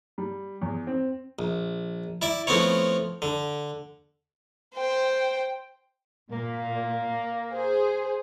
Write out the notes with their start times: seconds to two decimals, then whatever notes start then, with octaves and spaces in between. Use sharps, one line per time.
0.18 G3
0.62 E2
0.87 C4
1.39 A#1
2.22 E4 D5 E5
2.47 F3 A3 B3 C4 E4 C#5
3.22 D3
4.75 C5 G5
6.32 A#2 A#3
7.52 G#4 C5